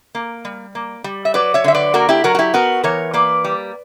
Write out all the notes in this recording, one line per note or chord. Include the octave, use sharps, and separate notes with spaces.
A#3
G3
A#3
G3
E5
F#3 B4 D5
C#5 E5
D3 E5
B4 D5
A#3 F#4 A#4
E4 G4
F#3 F#4 A#4
F#4
E4 G4
B3 F#4 A#4
E3 A#4 C#5
A#3 B4 D5
G3